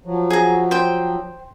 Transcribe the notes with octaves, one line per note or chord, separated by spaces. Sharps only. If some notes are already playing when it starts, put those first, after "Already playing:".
F3 F#3
G#4 A#5
C5 G5